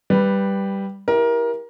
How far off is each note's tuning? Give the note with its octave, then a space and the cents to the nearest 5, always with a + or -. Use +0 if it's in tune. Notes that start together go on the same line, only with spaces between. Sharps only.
G3 +0 B4 +0
E4 +0 G4 +10 A#4 +20